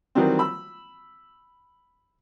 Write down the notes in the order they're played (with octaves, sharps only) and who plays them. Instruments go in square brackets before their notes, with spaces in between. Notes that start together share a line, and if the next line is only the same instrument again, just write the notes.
[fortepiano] D#3 E3 F#3 G3 C4
B5 E6